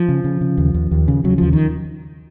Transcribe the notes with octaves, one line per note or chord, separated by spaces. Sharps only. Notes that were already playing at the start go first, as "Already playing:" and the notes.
Already playing: F3
C#3
C#3
C#3
D#2
D#2
D#2
C#3
C#3 F#3
D#2 F3
D#3